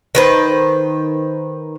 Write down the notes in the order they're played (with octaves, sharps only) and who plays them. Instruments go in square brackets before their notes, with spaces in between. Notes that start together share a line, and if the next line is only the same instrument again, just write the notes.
[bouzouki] D#3 B4 C5